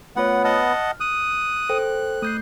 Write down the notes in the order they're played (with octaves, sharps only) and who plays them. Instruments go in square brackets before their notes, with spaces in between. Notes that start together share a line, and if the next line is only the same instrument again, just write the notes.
[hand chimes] A3 F4 C#5 [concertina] B3 [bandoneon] F#5
[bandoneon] D#5 F#5 A5 [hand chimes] F6
[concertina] D#6 [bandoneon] F#6
[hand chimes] A4 C5 G5
[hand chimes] A3 G6 C7 [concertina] D#6